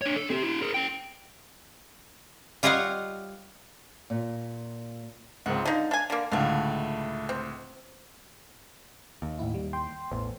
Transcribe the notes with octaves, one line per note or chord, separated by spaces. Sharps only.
D4 C#5
A4
C4 G4
E4 F#4
G#4 A#4
C#4 G5
G3 F4 C#5 D#5 F5 F#5
A#2
C#2 G#2 C4 F#5
D3 D#4 F5
D4 G#5
D3 A#3
C#2 A2 D3 A3 F5
C4
D#2
A1 E4
G3
G5 C6
A1 E2 C5